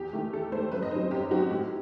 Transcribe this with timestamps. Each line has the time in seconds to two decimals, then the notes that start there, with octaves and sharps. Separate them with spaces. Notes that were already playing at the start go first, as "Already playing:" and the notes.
Already playing: E2 G4
0.13 D#3 A3
0.33 E2 A4
0.52 A3 C5
0.57 D#3
0.72 F#2 B4
0.83 D#5
0.91 F#3 C4 D#4 C5
1.11 F#2 G4
1.31 F#3 C4 D#4 F#4
1.50 A2 G4